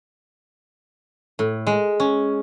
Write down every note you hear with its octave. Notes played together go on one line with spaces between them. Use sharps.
A2
G#3
C#4